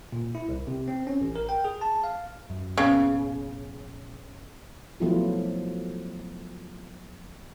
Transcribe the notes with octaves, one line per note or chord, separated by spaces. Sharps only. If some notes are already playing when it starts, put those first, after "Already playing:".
A#2
E4
C2
C3
C4
C#4
A1
A#4
G5
G#4
A5
F5
F#2
F1 A#1 C#3 B3
F3 F#3 A3 B3 E4 F4